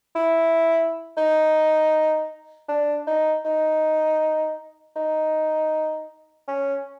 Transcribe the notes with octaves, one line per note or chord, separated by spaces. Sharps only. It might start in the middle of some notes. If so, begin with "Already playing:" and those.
E4
D#4
D4
D#4
D#4
D#4
C#4